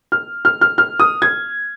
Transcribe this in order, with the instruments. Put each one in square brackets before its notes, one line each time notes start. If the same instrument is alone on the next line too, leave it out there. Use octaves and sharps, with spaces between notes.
[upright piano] F6
F6
F6
F6
D#6
G#6